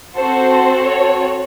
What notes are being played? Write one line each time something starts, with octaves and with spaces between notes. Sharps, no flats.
C4 F#4 A4 C5
C#5